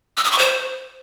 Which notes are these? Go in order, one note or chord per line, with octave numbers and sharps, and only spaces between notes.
E6
D#6
C#6
C5